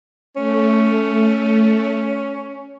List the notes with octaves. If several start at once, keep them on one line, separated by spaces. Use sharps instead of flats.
A3 C#4